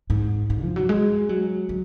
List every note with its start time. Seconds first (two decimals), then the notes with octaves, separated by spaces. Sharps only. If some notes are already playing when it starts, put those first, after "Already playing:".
0.10 G#2
0.50 G#2
0.62 F3
0.76 F#3
0.89 G#3
1.29 F#3
1.69 F#3